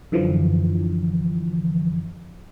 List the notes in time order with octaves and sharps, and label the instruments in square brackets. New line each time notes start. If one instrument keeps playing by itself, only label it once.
[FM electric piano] F#2 D3 E3 F3